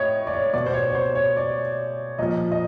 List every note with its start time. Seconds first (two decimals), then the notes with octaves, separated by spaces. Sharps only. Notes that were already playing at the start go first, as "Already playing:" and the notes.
Already playing: A2 C#5 D#5
0.27 D5
0.33 C#5
0.54 B2 D5
0.66 C5
0.74 C#5
0.90 C#5
0.95 C5
1.15 C#5
1.37 D5
2.19 A#2 F3 D#5
2.52 D#5